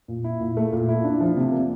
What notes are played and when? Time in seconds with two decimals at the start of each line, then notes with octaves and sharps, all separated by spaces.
0.08 A#2
0.24 E4
0.40 A#2
0.57 A3
0.73 A#2
0.89 E4
1.04 D4
1.21 F3
1.37 C3
1.52 A#3